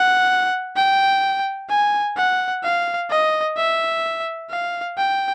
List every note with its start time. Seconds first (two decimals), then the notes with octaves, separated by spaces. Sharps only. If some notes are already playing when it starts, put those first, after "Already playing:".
Already playing: F#5
0.76 G5
1.70 G#5
2.17 F#5
2.64 F5
3.10 D#5
3.57 E5
4.50 F5
4.98 G5